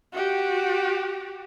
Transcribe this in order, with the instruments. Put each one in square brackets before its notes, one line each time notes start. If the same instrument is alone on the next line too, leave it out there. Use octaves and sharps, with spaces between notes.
[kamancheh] F#4 G4